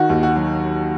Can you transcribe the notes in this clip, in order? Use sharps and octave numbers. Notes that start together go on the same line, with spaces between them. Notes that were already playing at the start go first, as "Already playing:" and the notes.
Already playing: D#3 F#4
D#2
F#4
F#3